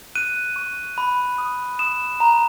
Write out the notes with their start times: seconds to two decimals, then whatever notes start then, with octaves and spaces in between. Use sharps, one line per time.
0.15 F#6 D#7
0.56 C#6
0.98 B5
1.38 D#6
1.79 D#6 E7
2.20 A#5